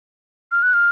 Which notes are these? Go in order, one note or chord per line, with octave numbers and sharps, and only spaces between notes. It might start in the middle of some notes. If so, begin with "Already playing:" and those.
F6
F#6
F6